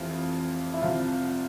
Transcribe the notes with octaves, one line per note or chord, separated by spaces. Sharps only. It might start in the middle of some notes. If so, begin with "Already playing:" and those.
Already playing: F1 F2 E3 F4
E4
C2 C3 F3 F4